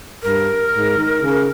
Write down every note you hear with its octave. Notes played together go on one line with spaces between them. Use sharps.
G2 A#4
G#2
D#3
C#3